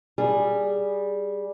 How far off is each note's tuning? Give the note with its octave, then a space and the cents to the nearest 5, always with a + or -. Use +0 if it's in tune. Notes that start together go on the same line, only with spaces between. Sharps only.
G3 +0 G#4 -15